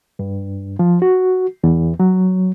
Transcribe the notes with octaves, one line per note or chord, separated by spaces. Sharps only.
G2
F3
F#4
E2
F#3